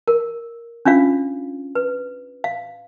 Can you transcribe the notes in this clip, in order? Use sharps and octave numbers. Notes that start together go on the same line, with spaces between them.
A#4
C#4 D4 F4 F5
B4
F5